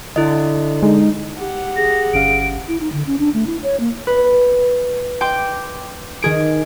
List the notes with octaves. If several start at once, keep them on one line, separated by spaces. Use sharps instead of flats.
D3 E4 D#5
G#3 D#4
G4 F#5
G#4 A#6
G1 C#4 F5 D7
E4
D#4
D3
C#4
D4
A3
E4
C#5
A#3
B4
G5 C6 D6
D#3 G#4 D7